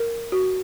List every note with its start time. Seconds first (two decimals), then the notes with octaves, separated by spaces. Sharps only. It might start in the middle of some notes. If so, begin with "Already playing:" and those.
Already playing: A#4
0.32 F#4